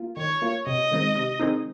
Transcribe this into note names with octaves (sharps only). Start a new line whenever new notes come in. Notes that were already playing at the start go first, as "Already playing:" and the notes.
Already playing: A#3 F4
D#3 C#5
A#3 F4
C3 D#5
D#3 G#3 C4 D#4
C3
D#3 G#3 C4 D#4